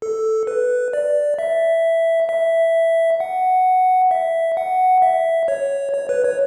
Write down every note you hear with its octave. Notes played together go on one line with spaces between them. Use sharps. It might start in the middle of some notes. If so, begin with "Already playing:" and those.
A4
B4
D5
E5
E5
F#5
E5
F#5
E5
C#5
C#5
B4
C#5